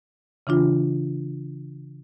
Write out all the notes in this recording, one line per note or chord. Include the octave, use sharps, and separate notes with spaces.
C#3 E3 D4 F4